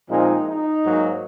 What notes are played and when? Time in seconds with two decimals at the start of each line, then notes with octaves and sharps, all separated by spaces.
0.09 A#2 F3 G#3 C4 D#4
0.46 D#4
0.83 G#2 F#3 A#3